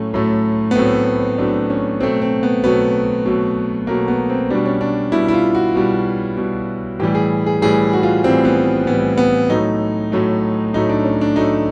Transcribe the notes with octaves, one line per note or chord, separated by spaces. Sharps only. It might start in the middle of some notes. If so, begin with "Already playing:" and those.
Already playing: A2 F#3 A3 C#4
A2 F#3 A3
B3
A2 F#3 A3 C4
A2 F#3 A3 D4
C#4
B2 F#3 A3 C4
C4
B3
B2 F#3 A3 B3
B2 F#3 A3
B2 F#3 A3 A#3
B3
C4
B2 G3 D4
C#4
D4
B2 G3 E4
E4
F4
F#4
B2 G3
B2 G3
A2 E3 G3 G4
G#4
G#4
A2 E3 G3 G#4
F#4
F4
A2 E3 G3 C4
B3
A2 E3 G3 B3
B3
A2 F#3 A3 D#4
A2 F#3 A3
A2 F#3 A3 D#4
D4
C#4
D4
A2 F#3 A3 D#4